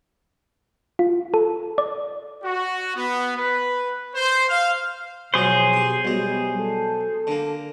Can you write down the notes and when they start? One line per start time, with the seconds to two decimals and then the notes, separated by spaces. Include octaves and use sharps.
0.99 F4
1.34 A4
1.78 D5
2.44 F#4
2.96 B3
3.37 B4
4.15 C5
4.49 F5
5.34 F2 B2 F#3 G#4 C5
5.73 G4 G5
6.05 B1 G3 G#3
6.59 A4
7.27 D3 A#3